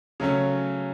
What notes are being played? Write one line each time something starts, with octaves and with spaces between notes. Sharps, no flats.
C#3 F#3 A3 C#4